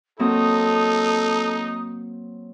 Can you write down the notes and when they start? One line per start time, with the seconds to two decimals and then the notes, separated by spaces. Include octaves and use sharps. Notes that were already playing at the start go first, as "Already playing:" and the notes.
0.19 F#3 A#3 C4 D#4 A4 D#6